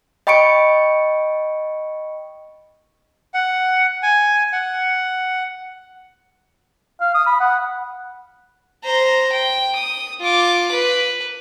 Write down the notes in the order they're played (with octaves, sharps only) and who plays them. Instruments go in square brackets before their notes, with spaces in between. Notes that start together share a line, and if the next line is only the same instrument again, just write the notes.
[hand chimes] D#5 G5 B5 C#6 C#7 D7
[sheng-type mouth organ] F#5
G#5
F#5
[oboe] F5
D#6
B5
F#5
[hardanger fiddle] C5 A#5
G5
D#6
F4 D6
B4